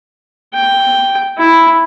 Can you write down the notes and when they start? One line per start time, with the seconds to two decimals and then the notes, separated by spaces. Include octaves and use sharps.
0.54 G5
1.38 E4